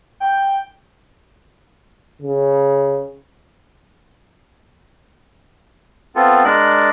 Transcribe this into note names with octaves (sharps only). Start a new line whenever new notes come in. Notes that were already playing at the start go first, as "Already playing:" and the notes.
G5
C#3
B3 C4 F4 A4
G#3 D4 A#4 D5 F#6